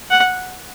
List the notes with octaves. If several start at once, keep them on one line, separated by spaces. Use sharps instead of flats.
F#5